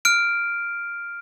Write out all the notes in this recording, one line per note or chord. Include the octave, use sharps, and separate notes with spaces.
F6 D7